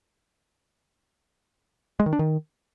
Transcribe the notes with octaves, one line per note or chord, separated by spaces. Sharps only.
G#3
D#3
D4
D#3